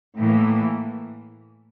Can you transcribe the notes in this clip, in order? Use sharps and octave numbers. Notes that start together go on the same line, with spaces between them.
A2 E3 A#3